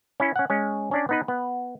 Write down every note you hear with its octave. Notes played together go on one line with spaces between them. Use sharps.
C#4 E4
C#4 F#5
G#3 C#4
C#4 D4 D5
B3 D#4 B4
B3